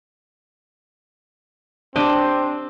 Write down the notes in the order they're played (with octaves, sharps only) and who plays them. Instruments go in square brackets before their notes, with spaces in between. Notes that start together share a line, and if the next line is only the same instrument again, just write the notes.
[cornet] C4 [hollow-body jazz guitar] D4 [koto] G4 D#5